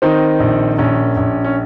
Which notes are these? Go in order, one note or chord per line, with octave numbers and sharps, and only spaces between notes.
D#3 C4 D#4
A#1
A#1 C#4
A#1
C#4